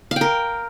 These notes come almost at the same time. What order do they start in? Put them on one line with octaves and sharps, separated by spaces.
F5 G5 A#4